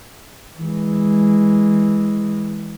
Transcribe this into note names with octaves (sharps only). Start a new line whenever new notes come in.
E3 G#3